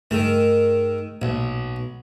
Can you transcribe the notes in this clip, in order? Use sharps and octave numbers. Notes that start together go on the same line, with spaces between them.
G2 D#3 A3 G#4 E6
B1 A#2